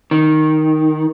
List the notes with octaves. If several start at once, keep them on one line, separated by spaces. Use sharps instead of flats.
D#3